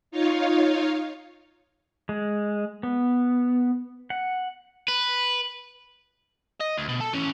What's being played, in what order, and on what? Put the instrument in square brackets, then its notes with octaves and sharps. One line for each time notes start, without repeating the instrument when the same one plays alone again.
[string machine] D#4 F4 C#5 F5
[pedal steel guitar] G#3
B3
F#5
[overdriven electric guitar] B4
D#5
D2
B2
A4
E3 C#4